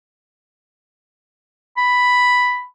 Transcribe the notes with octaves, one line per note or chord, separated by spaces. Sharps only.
B5